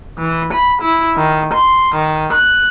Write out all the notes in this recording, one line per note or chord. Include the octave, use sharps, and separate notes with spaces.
E3
B5
E4
D#3
C6
D#3
F#6